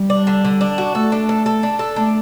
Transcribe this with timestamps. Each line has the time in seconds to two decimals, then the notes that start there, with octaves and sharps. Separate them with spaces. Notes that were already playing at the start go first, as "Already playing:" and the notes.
Already playing: G3
0.10 D4
0.27 D3
0.45 D3
0.61 D4
0.78 F#4
0.95 A3 A4
1.12 D4
1.29 A4
1.46 A4
1.63 D4
1.79 A4
1.96 A3 D4